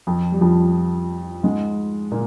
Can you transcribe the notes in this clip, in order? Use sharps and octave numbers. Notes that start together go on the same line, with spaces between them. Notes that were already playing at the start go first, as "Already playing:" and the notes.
F2 F3
G3
F2 F3
G#2 G#3
A#2 A#3